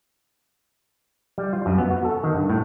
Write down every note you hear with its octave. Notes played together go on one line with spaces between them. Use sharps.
G3
F4
F#2
B3
F#4
A4
D#3
G2
A2